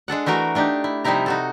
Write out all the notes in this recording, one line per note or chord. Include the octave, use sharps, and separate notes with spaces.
G#3 D4 A4 F#5
E3 A3 F#4 A#4
A3 D4 D#4 G4
E4
C3 F3 G3 D#4 E4 A#5
D#4 F#4 A4